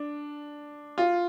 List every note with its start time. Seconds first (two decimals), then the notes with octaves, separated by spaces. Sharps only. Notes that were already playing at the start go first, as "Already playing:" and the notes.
Already playing: D4
0.98 F4